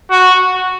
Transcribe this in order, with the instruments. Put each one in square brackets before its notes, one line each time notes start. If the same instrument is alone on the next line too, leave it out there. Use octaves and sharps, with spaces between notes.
[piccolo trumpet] F#4